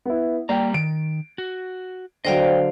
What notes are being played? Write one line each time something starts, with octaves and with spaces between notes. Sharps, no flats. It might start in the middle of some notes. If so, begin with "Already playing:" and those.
B3 E4
G3 A#3 D5 G5 A#5
D#3 D7
F#4
D3 F#3 C5 D5 D#5 F5 G5